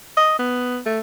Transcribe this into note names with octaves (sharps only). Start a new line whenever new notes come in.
D#5
B3
A3